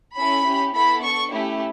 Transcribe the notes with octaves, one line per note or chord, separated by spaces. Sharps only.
C#4 E4 A4 B5
C#4 G4
B3 E4 A4 B5
D4 A4 C#6
A3 C#4 E4 G4